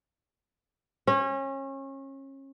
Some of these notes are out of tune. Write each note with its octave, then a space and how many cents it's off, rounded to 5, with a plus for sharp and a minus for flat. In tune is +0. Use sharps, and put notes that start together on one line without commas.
C#4 -30